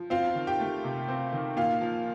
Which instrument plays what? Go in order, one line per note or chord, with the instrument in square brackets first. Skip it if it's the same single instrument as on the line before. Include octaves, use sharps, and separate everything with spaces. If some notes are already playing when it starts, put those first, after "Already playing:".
Already playing: [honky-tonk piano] F3
C4 F4 F5
D#3
G4 G5
A3
C3
C4
D#3
A#2 F4 F5
F3